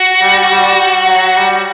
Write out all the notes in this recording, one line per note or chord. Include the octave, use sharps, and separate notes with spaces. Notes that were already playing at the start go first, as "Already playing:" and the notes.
Already playing: F#4
G3
G3
F#3
G3